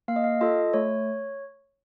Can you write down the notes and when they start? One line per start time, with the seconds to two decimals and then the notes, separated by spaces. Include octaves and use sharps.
0.08 A#3 F5
0.16 D#5
0.24 F5
0.41 F4 A4 D#5
0.73 A3 C#5